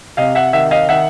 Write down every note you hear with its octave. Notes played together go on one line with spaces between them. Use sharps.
C3 D#5 F5
E5 F#5
D#3 E5 F#5
D#5 F5
D#3 E5 F#5